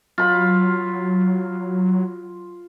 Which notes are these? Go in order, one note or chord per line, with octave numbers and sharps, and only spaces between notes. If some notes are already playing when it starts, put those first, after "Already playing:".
F#3 F4 B5